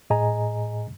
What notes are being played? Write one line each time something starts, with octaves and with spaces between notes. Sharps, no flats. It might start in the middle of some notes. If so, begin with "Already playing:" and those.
A2 G#4 D#5 G#5 A#5